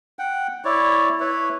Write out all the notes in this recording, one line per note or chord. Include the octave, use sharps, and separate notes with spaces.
F#5 G5
E4 C#5 D5
E4 B4 C#5